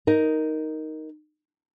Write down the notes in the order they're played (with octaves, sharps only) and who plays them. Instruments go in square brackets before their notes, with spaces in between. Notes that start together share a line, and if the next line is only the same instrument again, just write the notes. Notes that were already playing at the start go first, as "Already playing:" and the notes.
[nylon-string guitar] D#4 A#4